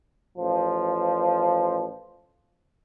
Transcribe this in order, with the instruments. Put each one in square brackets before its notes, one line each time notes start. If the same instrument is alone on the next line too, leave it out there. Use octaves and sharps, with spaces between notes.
[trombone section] A1 F3